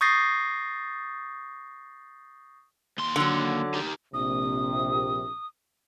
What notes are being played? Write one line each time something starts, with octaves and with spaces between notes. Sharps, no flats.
C#6 D#6 G6 A6 A#6 C7
D#2 C6
D3 F#3
D#4 G4
A#1 C3 D#6